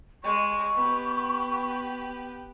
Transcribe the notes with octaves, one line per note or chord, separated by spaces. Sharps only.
G#3 C#6
B3 G4